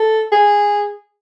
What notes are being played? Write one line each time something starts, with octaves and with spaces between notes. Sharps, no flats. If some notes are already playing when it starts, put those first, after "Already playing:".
Already playing: A4
G#4